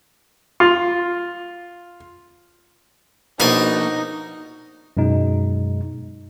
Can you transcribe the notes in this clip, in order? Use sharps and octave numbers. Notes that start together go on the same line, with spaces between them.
F4
A#1 B2 D#4 G#5 A5
F#2 B2 G#3 D#4